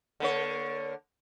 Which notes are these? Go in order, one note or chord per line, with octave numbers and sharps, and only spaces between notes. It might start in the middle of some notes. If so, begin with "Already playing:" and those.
D3 A#3 C#5